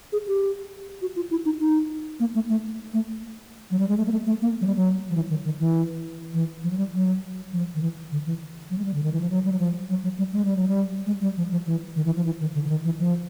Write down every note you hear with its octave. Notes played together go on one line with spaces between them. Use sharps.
G#4
G4
F#4
F4
E4
D#4
D#4
A#3
A3
A3
A3
F#3
G3
G#3
A3
A#3
A3
A3
A#3
F#3
G3
F#3
F3
E3
D#3
D#3
E3
E3
F3
F#3
G3
F#3
F3
D#3
E3
D3
E3
F#3
G#3
G3
D3
D#3
E3
F3
F#3
G3
F#3
F3
F#3
F#3
G3
G#3
G3
F#3
G3
G#3
G3
F3
F3
E3
D#3
E3
F3
E3
D#3
D3
D3
D#3
E3
F3